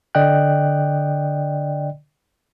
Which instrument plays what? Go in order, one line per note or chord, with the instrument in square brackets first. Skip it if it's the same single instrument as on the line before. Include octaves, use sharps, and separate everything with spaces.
[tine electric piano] D3 D5 D#5 G5 F#6